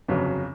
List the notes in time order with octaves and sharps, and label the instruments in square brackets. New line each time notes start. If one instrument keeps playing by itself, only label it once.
[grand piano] G1 F2 C#3 F#3